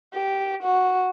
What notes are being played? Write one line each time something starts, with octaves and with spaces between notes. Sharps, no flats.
G4
F#4